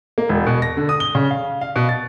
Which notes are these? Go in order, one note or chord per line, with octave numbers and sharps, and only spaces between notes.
A#3
E1
B2
A#6
D3
D#6
G7
C#3
F5
F5
B2
A6